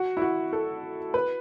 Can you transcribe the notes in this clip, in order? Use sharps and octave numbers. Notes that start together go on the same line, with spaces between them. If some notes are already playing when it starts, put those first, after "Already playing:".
Already playing: F#4
E4
F#4
A4
B4